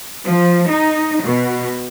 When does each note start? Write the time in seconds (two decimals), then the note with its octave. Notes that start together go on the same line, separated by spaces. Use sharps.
0.25 F3
0.70 D#4
1.23 B2